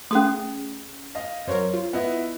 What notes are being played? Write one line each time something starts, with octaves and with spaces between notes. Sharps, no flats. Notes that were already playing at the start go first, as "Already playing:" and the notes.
A3 C#4 G#4 D#6
D#5 F5
F#2 F#3 A#4 C5 C#5
F4
B3 E4 D#5